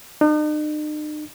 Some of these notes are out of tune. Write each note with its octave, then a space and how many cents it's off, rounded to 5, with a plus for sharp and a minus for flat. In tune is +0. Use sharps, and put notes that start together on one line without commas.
D#4 -45